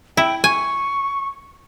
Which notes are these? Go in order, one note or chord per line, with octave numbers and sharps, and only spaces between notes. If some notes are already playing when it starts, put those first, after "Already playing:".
E4 G5
G#5 C#6